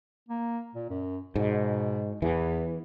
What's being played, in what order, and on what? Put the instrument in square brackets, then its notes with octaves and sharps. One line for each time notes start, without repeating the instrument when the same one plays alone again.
[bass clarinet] A#3
A#2
F#2
[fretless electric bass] G#2 [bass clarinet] B2
[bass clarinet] E2 [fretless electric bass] E3